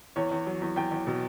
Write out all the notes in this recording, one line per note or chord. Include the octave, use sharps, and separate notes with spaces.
E2 C#5
E2
F#3
E2
E2 G5
E2
B2